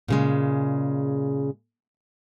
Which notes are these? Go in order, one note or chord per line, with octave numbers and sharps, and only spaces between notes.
A#2 C#3 G#3